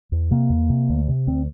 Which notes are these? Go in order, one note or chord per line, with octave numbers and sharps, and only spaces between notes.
E2
C3 A#3
E2
C3
D2
C3
D2 C4